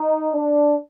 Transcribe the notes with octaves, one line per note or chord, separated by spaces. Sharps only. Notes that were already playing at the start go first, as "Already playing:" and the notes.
Already playing: D#4
D4